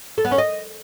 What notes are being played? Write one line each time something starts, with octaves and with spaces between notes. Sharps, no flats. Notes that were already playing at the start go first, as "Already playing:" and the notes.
A4
B3
C#4
D#5